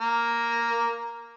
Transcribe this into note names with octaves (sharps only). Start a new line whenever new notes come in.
A#3 A#4